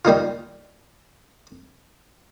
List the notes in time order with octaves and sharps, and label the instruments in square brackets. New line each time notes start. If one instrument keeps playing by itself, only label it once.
[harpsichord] G3 A#3 D#4 F4